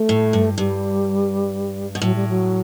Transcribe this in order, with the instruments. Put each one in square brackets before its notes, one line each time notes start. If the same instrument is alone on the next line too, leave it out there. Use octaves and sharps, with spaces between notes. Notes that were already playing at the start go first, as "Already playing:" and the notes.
Already playing: [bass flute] A3
[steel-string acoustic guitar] A2
G2
[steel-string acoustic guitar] G2 [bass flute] G3
[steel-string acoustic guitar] B2
[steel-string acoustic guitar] A2 [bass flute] F#3
[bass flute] G3
F#3